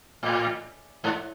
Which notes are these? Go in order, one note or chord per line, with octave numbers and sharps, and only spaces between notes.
A2
G#2